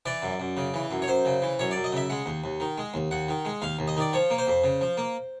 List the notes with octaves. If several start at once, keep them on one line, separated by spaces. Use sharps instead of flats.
E3 D5
F#2
F#2
C#3
E3
F#2
C#5
F#2 C5
C#3
E3
F#2 C#5
D5
F#2
D#5
C#3 E5
G#3 F#5
D#2
D#2
D#3
G#3
D#2
D#2 F#5
D#3
G#3
D#2 F5
D#2
D#5
D#3 D5
F3 C#5
A#3
C5
F2
C#3
F3
A#3